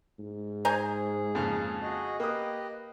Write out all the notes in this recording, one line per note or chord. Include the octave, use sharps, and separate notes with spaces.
G#2
G#4 C5 G#5 A#5
F2 A#2 C#3
F#4 G#4 D#5
A#3 G4 B4 D#5 D#6